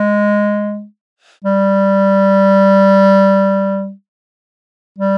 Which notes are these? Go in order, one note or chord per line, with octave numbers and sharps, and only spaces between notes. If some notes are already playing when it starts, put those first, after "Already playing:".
Already playing: G#3
G3
G3